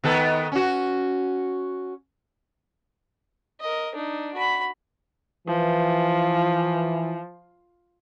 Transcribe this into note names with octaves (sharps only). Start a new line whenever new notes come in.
D#3 B3 A4
C#4 F#4
A#4 D#5
D4 D#4
F#4 B5
E3 F3